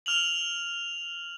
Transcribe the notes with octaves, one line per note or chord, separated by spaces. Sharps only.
F6 F7 F#7